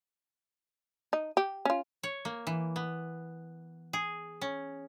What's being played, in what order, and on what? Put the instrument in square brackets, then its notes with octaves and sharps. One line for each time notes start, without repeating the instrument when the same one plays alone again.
[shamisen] D#4
G4
C#4 F4
[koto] C#5
A#3
E3
B3
G#4
C#4